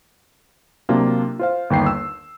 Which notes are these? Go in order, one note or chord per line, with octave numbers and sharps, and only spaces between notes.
C3 F#3 A#3 D4 F4
F4 C5 F5
G1 D#2 G5 C7
E6